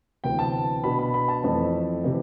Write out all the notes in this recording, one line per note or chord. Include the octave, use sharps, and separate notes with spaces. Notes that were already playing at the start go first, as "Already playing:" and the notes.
D2 C3 E3 B3 G5
A5
B2 B3 D4 B5
B5
B5
A5
F2 E3 A3 C4
C3 E3